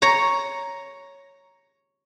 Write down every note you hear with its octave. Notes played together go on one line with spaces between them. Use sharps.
C#5 A#5